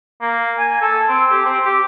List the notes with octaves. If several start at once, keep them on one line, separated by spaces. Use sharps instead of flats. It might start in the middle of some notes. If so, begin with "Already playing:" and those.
A#3
G#5
A4
C4
G4
C4
G4